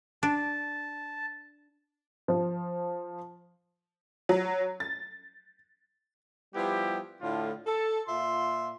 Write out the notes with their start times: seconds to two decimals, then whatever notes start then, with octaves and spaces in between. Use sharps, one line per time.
0.23 D4 A5
2.28 F3
4.29 F#3
4.80 A6
6.55 F3 G3 B3 E4 G4
7.21 A2 D3 F4
7.67 A4
8.07 A#2 F4 E5 C6